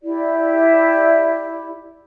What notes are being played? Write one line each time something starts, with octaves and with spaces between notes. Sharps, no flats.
E4 G4 D5